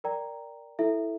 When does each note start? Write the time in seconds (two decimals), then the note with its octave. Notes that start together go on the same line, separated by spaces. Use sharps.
0.04 A#4 D5 G5 A#5
0.79 E4 A4 E5